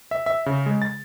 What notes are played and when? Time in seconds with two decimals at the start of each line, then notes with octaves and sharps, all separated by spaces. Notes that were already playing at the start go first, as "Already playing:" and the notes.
0.11 E5
0.26 E5
0.46 C#3
0.66 G#3
0.82 A6